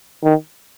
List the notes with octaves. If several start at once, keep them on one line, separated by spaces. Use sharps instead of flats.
D#3